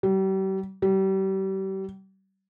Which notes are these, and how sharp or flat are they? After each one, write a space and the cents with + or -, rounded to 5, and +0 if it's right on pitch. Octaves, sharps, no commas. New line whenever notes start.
G3 -40
G3 -35